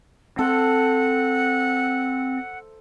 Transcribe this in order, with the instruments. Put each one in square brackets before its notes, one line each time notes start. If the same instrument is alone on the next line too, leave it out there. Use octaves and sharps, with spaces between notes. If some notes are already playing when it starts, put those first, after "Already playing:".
[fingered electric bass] C4 [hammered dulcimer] A4 C5 E5 [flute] F#5